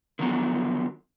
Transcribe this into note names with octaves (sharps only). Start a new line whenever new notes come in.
D3 D#3 F3 F#3 G#3 B3